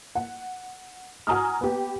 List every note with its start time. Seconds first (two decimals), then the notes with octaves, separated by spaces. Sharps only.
0.15 F#5
1.27 F#4 G#5 A#5 D#6 F6
1.61 B3 G4